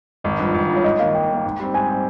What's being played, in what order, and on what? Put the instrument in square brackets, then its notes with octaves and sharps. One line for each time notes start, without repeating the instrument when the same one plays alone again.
[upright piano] G#1 [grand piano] D#5
[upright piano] G2 F3
G#1
G2 F3
[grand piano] C#5
[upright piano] G#2 [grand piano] D#5
[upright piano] D#3 A#3 [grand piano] F5
[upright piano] G#2 [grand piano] G5
[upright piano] D#3 A#3
G#2
G3 C4
[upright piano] G#2 [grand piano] G#5
[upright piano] G3 C4